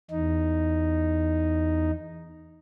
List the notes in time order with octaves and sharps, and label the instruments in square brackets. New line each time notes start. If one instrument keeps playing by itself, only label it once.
[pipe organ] E2 D#4